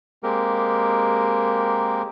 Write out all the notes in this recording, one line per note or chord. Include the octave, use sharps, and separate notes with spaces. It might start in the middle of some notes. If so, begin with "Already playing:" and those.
G#3 A#3 C4 G4 A#4